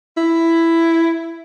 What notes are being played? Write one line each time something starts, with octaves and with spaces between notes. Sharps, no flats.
E4